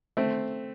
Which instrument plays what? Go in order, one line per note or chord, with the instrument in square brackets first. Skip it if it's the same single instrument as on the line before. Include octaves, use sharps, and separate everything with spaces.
[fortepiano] A3 C4